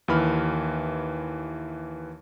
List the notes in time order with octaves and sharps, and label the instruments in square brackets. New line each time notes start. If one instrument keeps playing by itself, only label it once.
[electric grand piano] D#2 E3 B5 F6